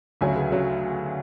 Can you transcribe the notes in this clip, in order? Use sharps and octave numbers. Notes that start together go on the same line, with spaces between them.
D2 C#3 F#3 E5 G#5
G#4 B4
C#3 F#3